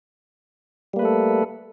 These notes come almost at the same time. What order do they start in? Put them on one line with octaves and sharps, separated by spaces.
G3 A#3 B4 A3 A4